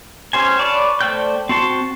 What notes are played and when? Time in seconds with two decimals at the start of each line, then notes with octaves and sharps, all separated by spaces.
0.33 C#4 G4 C5 G#5
0.59 B4 C#5 D5 A5
1.01 A3 C5 D5 G5 G6
1.49 C4 F#4 A5 C6